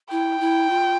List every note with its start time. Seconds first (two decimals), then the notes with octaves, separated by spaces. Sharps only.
0.11 E4 G5
0.40 E4
0.70 F4